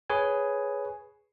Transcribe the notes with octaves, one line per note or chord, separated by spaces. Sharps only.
G#4 B4 C#5 G#5